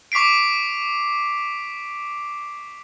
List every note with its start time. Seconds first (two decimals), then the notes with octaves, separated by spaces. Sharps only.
0.12 C#6 D6 B6 C7 D7